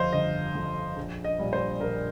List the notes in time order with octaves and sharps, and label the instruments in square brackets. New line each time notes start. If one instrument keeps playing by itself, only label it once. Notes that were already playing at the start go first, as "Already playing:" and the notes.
Already playing: [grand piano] G1 F2 F3 C5 D#5 F5
G1 D#5
F2 F3
A#1
D#5
A#2 G3
C5
A#1 A#4